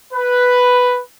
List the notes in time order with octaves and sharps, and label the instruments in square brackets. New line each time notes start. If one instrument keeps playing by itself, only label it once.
[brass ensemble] B4